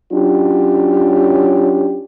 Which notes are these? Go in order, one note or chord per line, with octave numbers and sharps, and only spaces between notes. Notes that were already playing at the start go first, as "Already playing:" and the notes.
F#3 C#4 D4 F4 G4